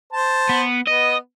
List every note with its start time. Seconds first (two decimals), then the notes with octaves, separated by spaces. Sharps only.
0.13 C5 A5
0.49 B3
0.87 B3 D#5